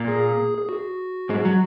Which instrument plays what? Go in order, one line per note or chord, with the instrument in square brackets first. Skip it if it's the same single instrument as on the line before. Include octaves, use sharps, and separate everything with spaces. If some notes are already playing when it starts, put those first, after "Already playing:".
Already playing: [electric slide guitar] A#2 A#3
[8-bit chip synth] G#4
G#4
F#4
[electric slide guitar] G#2 G#3
F#3